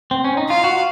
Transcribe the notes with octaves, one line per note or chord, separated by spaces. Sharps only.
C4
C#4
D#4
F4 F5
F#4